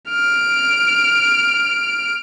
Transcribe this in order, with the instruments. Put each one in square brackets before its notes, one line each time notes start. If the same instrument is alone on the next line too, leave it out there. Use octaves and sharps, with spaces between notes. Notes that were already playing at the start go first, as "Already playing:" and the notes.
[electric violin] F6 D7